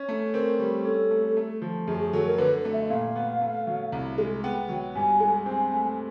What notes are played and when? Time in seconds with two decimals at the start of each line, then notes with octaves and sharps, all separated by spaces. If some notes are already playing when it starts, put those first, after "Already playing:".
Already playing: C#4
0.09 A3
0.34 C4 A#4
0.59 G3
0.85 C#4 A4
1.11 A3
1.37 A3
1.62 F3
1.87 F#2 G#4
2.00 G#4
2.13 F#3 A4
2.26 A#4
2.38 D3 B4
2.65 A3
2.73 E5
2.84 E5
2.90 A#2 F5
3.16 B3
3.41 A3
3.67 F#3
3.92 C2
4.18 G#3
4.44 B3 G5
4.69 F#3
4.95 G2 G#5
5.20 G#3
5.46 C4 G#5
5.72 A3